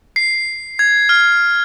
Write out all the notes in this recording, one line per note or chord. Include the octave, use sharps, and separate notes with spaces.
C7
G#6
F6